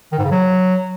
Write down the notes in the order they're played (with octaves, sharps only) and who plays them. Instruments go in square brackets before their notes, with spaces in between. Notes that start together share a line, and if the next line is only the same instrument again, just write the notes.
[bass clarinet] D#3
G#2
C#3
F#3